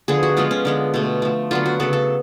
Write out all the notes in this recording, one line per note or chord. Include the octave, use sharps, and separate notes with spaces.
D3 F3 B3 G#4
F#4
F3 G#3 B3 F4
C#4
D3 G#3 B3
B2 A3
F3 A3
D3 F#3 B3 F4
F#4
C#3 F#3 B3 A4
A4